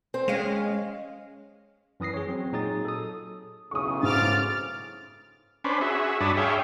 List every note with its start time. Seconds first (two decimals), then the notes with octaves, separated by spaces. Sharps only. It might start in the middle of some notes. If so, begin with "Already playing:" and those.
0.14 C4 C5
0.28 G#3 C#4 F5
2.00 F#2 E3 D#6 A#6 C7
2.14 G#4 C#5
2.27 F#3 C4
2.53 A#2 F#3 D#4 G#4 D#6 A6
2.85 A4 D#6
3.71 B1 A2 C#3 C#6 D#6
4.03 G#2 D6 F6 A6
5.64 C#4 D4 B4 C5
5.81 F#4 G#4 E5
6.21 G2 D4 C#5 A5 B5 D#6
6.37 G#4 C#5 E5 F5 G5